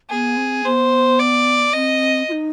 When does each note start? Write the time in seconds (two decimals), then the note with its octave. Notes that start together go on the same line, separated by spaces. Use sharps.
0.10 B3 G#4
0.37 C4
0.65 B3 C5
1.19 D5
1.74 C4 D#5
2.28 F4
2.32 D#4